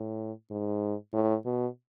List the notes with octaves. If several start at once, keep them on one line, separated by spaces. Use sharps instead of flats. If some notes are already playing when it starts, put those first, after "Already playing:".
Already playing: A2
G#2
A2
B2